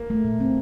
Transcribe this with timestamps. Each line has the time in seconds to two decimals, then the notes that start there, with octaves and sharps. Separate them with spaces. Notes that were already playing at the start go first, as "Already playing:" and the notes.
Already playing: A#3
0.10 A3
0.24 A#2
0.40 C4